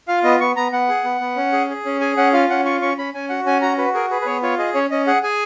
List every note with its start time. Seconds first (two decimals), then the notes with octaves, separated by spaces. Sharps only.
0.08 F4 F5
0.24 B3 D#5
0.40 B3 C#6
0.56 B3 A#5
0.72 B3 F#5
0.89 G#4
1.04 B3
1.21 B3
1.37 C#4
1.52 G#4
1.70 G#4
1.85 C#4
2.01 G#4 G#5
2.17 C#4 F#5
2.33 F4 F5
2.50 C#4 F#5
2.65 F4 C#6
2.82 C#4 C#6
2.98 C#4 B5
3.14 C#4 G#5
3.29 F#4 F#5
3.46 C#4 G#5
3.62 F#4 A#5
3.78 F#4 B4
3.94 G#4 A#4
4.10 G#4 B4
4.22 B4
4.26 B3 C#5
4.42 F4 C#5
4.59 G#4 D#5
4.74 C#4 C#5
4.91 C#4 D#5
5.07 G#4 F#5
5.23 G#4 G#5